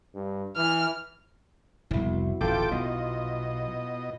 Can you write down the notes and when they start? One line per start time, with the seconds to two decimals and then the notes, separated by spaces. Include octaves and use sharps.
0.15 G2
0.57 E3 F6
1.91 F1 C2 B2 E4
2.41 D1 A1 F4 A4 G5 D6
2.72 B1 B2 D#5